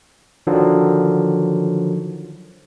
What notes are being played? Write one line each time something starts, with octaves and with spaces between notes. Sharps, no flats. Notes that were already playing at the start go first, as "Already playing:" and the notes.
D3 D#3 F3 F#3